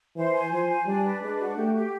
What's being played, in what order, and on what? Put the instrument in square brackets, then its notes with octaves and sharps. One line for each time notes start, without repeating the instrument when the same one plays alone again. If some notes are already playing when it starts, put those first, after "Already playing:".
[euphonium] E3 [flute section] C5
[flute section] G#5
[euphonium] F3 [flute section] C5
[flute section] G#5
[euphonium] G3 [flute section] D4
[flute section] B4
[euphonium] G#3 [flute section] D4
[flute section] F#4
[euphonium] A3 [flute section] G4
[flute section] G4